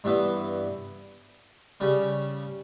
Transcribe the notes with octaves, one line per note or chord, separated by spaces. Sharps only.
G2 E3 B3 E4
C#3 G3 C#4